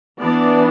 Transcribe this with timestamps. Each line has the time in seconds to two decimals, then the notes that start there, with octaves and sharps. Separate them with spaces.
0.20 E3 B3 D4 D5